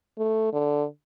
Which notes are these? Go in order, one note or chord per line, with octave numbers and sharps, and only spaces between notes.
A3
D3